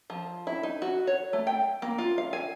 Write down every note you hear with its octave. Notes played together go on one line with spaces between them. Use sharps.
F3
E4
D#4
F#4
C#5
A3
G5
A#3
F4
F5
G#5